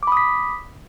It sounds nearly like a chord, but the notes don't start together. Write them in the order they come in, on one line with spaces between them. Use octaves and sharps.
D6 B5 D#6 B6